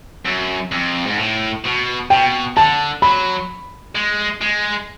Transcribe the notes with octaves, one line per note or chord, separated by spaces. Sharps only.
F#2
F2
G#2
A2
B2
B2 G5
D3 A5
F#3 B5
G#3
G#3